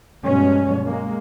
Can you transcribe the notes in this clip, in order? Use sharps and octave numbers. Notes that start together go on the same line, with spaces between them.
G2 B2 F3 F#3 G#3 C#4
G#3 A#3